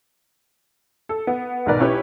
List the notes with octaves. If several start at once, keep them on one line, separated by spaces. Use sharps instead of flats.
A4
B3
B1 G#2 D#3 A#4 B4 D5
C#4 E4 G4 B4